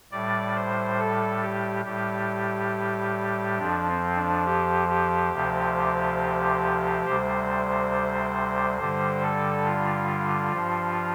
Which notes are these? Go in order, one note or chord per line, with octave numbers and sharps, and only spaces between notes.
A2 G3 D5
C5
A4
G4
A2 G3 G4
F2 F3 D4
C4
D4
G4
G4
D2 C3 F3
D2 C3 G3 C5
G2 D3 G3 C5
A4
F4
G2 F3